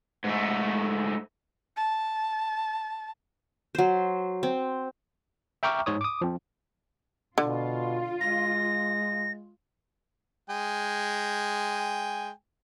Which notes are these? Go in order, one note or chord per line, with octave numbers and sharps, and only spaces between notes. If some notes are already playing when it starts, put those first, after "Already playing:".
G#2 A3
A5
F#3 C5
C4
E5 G5 A#5 C#6 D6 F6
G#2 D#4 C#5 D#6
D6 D#6
F3 C4
B2 D3 F4
G#3 A#6
G#3 G5 G#5